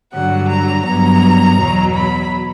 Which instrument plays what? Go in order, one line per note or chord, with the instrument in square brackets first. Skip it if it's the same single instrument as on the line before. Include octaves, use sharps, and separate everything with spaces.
[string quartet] G2 D3 F#3 F#5
A#5
G2 F#3 B3 A#5
E2 B2 F#3
B5